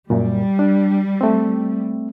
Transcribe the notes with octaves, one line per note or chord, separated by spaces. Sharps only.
F#2 A#2 G3
D4
A3 C4